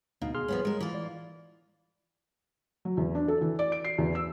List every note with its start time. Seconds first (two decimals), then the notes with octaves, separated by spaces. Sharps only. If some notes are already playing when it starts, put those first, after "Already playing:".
0.22 D2 B2 D#4 F5
0.35 G#4 C6 F6
0.48 F3 B3 C#4
0.65 G#3 A#4
0.80 E3 F4
0.94 D5
2.85 F#3
2.97 E2
3.15 D4
3.28 A4
3.41 E3
3.59 D5
3.72 D7
3.85 C7
3.98 E2
4.15 E6